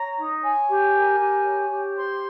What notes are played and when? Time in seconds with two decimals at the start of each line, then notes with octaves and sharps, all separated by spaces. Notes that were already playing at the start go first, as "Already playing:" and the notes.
Already playing: C#5 A#5
0.18 D#4
0.43 C#5 G#5
0.69 G4
0.94 A#4
1.19 G4
1.44 C#5
1.70 G4
1.95 C5 C6